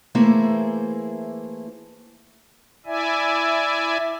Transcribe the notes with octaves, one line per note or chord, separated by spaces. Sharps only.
E3 A3 A#3 E4 G#4 C5
E4 D5 E5 G#5